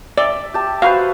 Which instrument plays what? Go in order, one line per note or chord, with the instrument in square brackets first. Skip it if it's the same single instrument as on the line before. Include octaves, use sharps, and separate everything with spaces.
[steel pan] D5 [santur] E5
[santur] G4 A5
[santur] F#4 B4 C5 [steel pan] F5